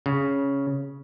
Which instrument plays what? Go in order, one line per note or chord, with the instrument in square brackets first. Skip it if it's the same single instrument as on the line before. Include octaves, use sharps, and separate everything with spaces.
[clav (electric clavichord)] C#3